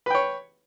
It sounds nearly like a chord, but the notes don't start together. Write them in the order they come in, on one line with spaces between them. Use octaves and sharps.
B4 G5 C#5